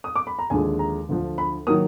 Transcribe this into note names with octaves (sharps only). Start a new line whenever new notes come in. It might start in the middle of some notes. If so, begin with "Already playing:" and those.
D#6
D6
B5
A#5
D#2 D3 F3 G#3 G#5
A#5
D2 D3 F3
B5
D#3 F#3 A#3 D#6